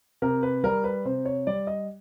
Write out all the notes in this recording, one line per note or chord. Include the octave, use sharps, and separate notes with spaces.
C3 A#4
B4
G3 A#4
B4
C3 C5
C#5
G3 D5
D#5